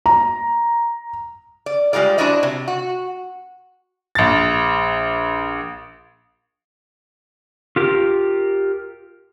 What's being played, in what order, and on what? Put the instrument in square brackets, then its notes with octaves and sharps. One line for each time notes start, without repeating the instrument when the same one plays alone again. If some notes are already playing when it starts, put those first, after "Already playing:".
[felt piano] A#5
[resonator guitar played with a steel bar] D5
G3 G#3 F4 G#4 D5
D4 E4 F#4 C5 D5 D#5
C3
F#4
[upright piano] A#1 A6
[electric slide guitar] F4 G4 A#4